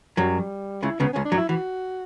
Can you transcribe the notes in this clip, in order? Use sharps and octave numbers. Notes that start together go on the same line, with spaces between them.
F#2 F#3 G3
C#2 C#3 E4
C#2 C#3 B3
C#2 C#3 C#4
D4
F#2 F#3
E4
E3 F#4